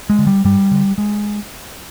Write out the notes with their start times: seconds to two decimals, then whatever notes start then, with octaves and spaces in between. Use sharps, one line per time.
0.10 G#3
0.19 D3
0.27 G3
0.44 G2 G3
0.71 D3
0.98 G#3